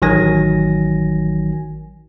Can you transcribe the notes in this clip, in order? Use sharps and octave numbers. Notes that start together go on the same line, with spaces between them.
A1 D#3 F#3 G#5 A#6